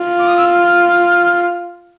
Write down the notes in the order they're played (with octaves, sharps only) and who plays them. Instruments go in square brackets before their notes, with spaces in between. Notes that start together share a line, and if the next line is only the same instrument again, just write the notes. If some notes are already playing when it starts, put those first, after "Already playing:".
Already playing: [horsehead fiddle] F4
[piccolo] D6
D#6
E6
F6